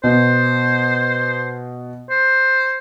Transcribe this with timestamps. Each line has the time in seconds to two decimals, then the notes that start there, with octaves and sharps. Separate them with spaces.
0.04 B2 C5
2.10 C5